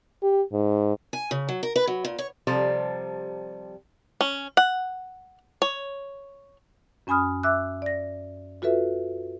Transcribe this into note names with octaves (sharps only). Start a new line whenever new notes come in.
G4
G#2
G#5
C#3
F#3
A#4
B4
F#3
A#2
C#5
C3 F3 G3 A4 C5
C#4
F#5
C#5
F#2 C#4 G#5 B5 D#6 F6
E5 D6 E6 F#6
D5 A#6
F4 F#4 A4 B4 E5